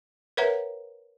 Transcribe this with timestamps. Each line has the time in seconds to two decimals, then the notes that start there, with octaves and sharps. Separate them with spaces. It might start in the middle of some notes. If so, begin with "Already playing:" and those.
0.37 A#4 B4 C#5 E5 F#5 A#5